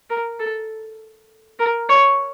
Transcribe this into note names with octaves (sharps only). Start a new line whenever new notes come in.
A#4
A4
A#4
C#5